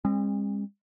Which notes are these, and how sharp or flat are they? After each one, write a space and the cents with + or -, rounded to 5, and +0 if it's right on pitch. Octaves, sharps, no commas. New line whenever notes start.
G#3 -40 C4 +45